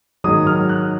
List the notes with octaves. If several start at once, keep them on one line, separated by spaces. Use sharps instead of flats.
G#2 D#3 F#3 D#6
F6
F#6